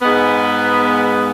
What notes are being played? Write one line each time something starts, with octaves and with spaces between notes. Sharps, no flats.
G#2 G#3 B3